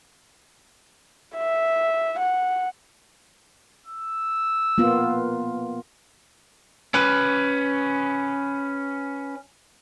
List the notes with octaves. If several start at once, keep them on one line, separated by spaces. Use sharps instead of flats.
E5
F#5
E6
A#3 B3 F4
C#4 B4